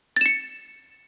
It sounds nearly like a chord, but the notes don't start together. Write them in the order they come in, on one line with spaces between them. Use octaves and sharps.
A6 E7 C#7